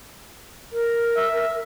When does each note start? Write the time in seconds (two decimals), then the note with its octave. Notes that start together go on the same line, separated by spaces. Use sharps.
0.72 A#4
1.16 E5